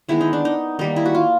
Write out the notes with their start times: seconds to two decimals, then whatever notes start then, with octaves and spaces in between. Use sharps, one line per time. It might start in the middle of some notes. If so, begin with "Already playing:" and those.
0.09 D#3 G#3 B3 E4
0.21 D#4
0.33 D4
0.45 D#4
0.79 D#3 G3 A#3 D#4
0.96 E4
1.05 F#4
1.15 F4